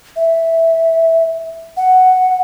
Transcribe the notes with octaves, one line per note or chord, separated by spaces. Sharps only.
E5
F#5